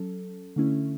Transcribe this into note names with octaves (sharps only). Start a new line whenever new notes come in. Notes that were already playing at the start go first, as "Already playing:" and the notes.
Already playing: F#3 C#4 A4
D3 A3 C#4 E4